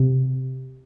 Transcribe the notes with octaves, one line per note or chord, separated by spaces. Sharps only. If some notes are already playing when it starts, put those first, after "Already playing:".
Already playing: C3